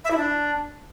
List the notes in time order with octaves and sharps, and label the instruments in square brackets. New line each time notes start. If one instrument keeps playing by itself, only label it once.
[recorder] E5
E4
D4